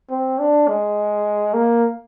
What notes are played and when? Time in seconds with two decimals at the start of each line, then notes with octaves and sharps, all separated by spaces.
0.10 C4
0.39 D4
0.68 G#3
1.54 A#3